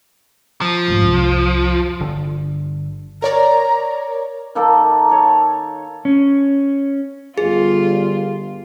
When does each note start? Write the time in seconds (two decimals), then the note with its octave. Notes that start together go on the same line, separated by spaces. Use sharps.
0.61 F3
0.88 G#2 D3
1.01 C2 F2
2.01 G1 D3
3.22 A#4 C#5 D5 A#5
4.55 D#3 A#3 A4
5.09 A4 C#5
6.05 C#4
7.38 G1 F4 G#4